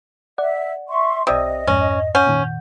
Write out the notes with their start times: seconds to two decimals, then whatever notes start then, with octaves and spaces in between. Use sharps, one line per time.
0.38 D5 E5 F#5
0.88 E5 C6 C#6
1.27 B1 C3 D5 D#5 D#6
1.67 F2 G#2 C#4
2.15 C#4 F#5 G6
2.27 A#2 D#3